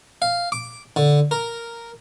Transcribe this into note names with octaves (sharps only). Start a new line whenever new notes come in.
F5
D6
D3
A#4